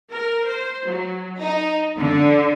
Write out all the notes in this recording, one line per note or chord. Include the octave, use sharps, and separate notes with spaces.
A#4
C5
F#3
D#4
D3